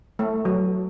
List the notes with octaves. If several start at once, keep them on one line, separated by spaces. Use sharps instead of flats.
A3
F#3